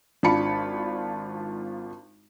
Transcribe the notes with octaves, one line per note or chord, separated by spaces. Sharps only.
G#1 D4 F4 A5 B5 C#7